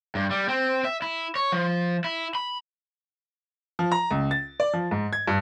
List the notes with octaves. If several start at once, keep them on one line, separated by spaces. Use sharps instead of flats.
G2
G3
C4
E5
E4
C#5
F3
E4
B5
F3
A#5
C#2
A6
D5
F3
G#2
G#6
G2